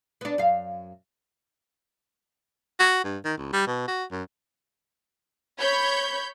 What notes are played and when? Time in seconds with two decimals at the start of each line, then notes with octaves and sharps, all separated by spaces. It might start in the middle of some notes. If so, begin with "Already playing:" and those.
0.21 B3 D4
0.38 F#2 F5
2.80 F#4
3.04 G2
3.25 D#3
3.37 C#2
3.53 G3
3.68 B2
3.88 F#4
4.12 F#2
5.59 C#5 B5 G6 G#6